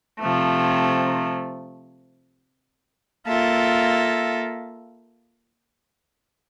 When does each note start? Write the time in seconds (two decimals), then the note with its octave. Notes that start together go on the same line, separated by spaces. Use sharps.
0.20 C3 F3 A3
3.27 A#3 F4 A4 E5